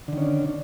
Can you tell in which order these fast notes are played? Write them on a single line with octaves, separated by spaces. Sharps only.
D3 D#3 C#4 D4